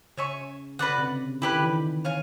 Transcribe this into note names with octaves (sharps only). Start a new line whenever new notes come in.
C#3 C#5 E5 G#5 C#6
D3 F#4 B4 D5 F#5
C#3
C3
C#3
D3 E4 G4 B4
D#3
E3
D#3
C#5 F5 G#5